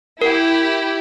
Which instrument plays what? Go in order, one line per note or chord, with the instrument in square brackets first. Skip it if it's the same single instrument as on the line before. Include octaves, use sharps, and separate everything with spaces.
[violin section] E4 G4 [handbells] A#4